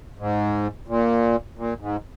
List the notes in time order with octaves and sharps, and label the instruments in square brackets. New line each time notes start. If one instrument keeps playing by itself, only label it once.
[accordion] G#2
A#2
A#2
G#2